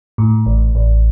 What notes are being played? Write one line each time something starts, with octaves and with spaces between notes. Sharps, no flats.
A2
A1
A1